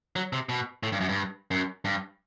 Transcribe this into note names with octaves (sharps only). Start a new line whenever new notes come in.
F#3
C3
B2
A2
G2
F#2
G2
F#2
G2